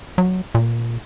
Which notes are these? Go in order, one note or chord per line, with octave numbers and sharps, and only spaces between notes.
F#3
A#2